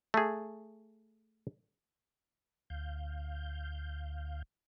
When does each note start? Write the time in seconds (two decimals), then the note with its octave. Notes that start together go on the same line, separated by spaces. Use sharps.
0.14 A3 G#4
2.70 D2 F5 G6